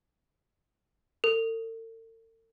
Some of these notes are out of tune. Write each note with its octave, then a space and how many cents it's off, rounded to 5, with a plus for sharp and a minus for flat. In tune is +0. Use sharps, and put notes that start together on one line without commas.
A4 +45